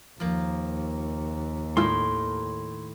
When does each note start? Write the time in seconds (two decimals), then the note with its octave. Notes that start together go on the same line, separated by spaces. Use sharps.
0.20 D#2 F3 A#3
1.77 A2 D#3 G#3 E4 F4 C6